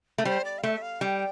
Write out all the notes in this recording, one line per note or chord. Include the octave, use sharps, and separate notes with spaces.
A3
G3 C5
D5
F5
A3 E5
F5
G3 G5